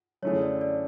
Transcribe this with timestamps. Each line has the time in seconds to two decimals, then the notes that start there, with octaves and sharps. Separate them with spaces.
0.22 F#2 D3 A3 E4 G#4 C#5
0.42 D5
0.61 D5